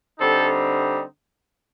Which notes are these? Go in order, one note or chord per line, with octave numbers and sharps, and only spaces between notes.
D3 G3 C4 D#4 A4